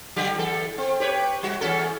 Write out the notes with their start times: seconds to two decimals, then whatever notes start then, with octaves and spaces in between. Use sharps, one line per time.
0.16 D3 F#3 G4
0.35 E2 A4
0.78 C4
1.00 G4 B4 C#5
1.43 G3 F#4
1.61 E2 C#4 A4